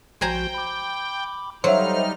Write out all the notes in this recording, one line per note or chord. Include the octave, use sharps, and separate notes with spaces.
A#1 F3 F#4 C5 G5 G#5 A#5
B5 D6
F#3 G3 D#4 A4 C5 E5 F5 F6